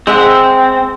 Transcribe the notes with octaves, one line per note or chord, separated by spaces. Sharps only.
G#3 C4 E5 F#5